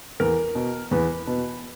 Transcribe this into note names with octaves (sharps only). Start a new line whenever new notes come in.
E2 A#4
B2
E2 B4
B2